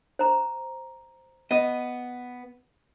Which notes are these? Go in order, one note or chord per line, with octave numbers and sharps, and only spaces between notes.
C5 A#5
B3 D#5